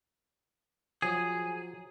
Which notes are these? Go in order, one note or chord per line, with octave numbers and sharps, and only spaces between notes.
F3 F#3 G#4